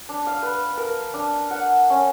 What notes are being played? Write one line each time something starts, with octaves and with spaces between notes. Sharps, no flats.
D4
F5
B4
A#4
D4
F#5
C#4